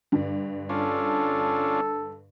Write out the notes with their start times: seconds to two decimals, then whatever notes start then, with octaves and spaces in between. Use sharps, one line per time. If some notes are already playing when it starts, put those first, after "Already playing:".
0.12 G2 D3
0.69 C#4 D4 F4 A4